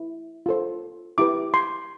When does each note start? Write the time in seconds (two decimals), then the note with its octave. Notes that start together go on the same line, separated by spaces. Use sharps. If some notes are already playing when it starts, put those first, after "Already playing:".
Already playing: E4
0.46 F4 A4 C5
1.18 E4 G4 B4 D6
1.54 C6